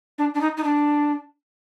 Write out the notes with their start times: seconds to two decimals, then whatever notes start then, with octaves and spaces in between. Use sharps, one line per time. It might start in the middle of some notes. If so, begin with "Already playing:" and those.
0.18 D4
0.34 D4
0.41 D#4
0.57 D#4
0.64 D4